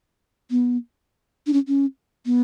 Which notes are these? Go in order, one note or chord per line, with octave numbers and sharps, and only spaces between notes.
B3
D4
C#4
C#4
B3